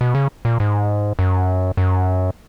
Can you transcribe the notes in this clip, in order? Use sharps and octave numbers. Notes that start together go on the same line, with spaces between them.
B2
C#3
A#2
G#2
F#2
F#2